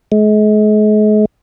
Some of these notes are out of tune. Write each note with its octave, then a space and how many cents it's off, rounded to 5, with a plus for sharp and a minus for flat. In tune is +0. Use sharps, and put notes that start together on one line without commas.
G#3 +40